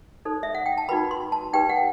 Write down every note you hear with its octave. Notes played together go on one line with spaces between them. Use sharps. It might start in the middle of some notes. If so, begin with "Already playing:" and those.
D#4 A4 C5
E5
F#5
G5
A5
D#4 F#4 B4 B5
C6
A5
D#4 G4 B4 G5
F#5